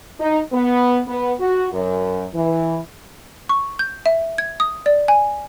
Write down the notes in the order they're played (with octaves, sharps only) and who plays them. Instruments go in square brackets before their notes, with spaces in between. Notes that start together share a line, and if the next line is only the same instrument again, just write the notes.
[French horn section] D#4
B3
B3
F#4
F#2
E3
[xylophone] C#6
G6
E5
G#6
D#6
D5
G#5